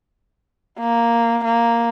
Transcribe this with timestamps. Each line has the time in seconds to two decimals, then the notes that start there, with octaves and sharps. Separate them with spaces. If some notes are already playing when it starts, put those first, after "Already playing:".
0.80 A#3
1.45 A#3